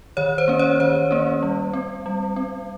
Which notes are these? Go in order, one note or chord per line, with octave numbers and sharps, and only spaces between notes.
D#3 C#5
C5
A#3 C#4
C#5
D#3 C5
A#3 C#4
G3
C4
G3
C4